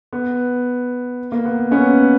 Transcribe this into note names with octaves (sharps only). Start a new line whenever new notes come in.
B3
A#3
B3
B3 C#4